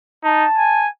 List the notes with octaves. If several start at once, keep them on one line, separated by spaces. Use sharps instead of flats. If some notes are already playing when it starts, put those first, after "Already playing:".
D#4 A5
G#5